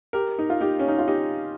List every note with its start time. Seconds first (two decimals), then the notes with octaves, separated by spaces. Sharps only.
0.13 G4 A#4
0.39 D#4
0.50 F4
0.61 D#4 G4
0.79 C#4
0.88 D#4
0.98 F4
1.08 D#4 G4